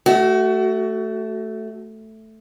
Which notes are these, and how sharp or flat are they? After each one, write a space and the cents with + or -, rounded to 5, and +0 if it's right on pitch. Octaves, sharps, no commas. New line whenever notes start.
A3 +0 F#4 +25